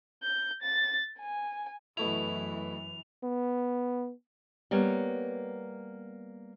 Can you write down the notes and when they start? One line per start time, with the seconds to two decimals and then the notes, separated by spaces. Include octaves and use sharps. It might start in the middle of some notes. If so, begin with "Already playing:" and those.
0.23 G6
0.62 A6
1.20 G#5
1.97 F#2 B2 E3 A3 E4 F7
3.23 B3
4.71 G3 A#3 B3 C#5